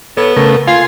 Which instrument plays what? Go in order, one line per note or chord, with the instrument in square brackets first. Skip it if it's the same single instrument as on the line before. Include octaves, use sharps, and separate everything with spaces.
[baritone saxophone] B3 [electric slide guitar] A4 C#5
[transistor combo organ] C#3 A3 [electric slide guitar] A#4
[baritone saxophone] F4 [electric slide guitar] F5 [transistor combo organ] G#5 C6